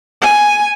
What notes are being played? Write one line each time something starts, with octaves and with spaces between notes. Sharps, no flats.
G#5